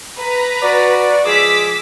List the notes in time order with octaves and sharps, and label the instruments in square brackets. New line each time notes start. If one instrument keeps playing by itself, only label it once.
[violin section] B4 A#5
[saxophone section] F#4 D5
[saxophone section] F3 G#3 G#4 [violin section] D6 E6 B6